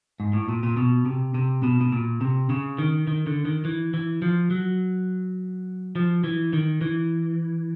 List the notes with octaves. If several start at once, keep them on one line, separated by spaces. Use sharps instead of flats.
G#2
A2
A#2
A#2
B2
C3
C3
B2
B2
A#2
C3
C#3
D#3
D#3
D3
D#3
E3
E3
F3
F#3
F3
E3
D#3
E3